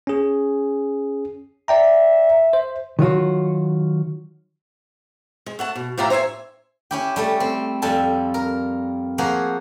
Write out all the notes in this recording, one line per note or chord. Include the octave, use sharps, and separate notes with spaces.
C#4 G#4
D5 E5 G5 A#5
C5
D#3 F#3 F4 F#4
G#3
A3 F#5 A5
B2
A2 E3 F4 G4 E5 A#5
C5 C#5 D#5 E5 G#5
C#4 E4 G4
G3 A3 A4
C4
F2 G3 A4 G#5 A5
A#4
F3 A#3 F#4 G#4